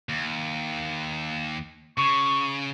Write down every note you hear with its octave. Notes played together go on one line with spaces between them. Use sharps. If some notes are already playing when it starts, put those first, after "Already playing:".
D#2
C#3 C#6